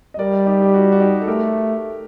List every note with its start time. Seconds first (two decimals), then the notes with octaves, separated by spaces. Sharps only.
0.14 D#5
0.19 G3 A#4 D5
0.46 D#4 G4
0.62 G4
0.74 F#4
0.92 F#4
1.00 D#4 G4
1.22 A4
1.27 A3 G4 A#4